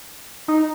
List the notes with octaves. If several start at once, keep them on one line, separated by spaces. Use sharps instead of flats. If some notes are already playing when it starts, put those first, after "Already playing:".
D#4